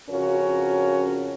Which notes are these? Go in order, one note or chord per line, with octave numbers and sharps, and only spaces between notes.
F2 C#3 C#4 F4 F#4 A#4